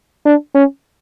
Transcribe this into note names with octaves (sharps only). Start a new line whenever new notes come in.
D4
C#4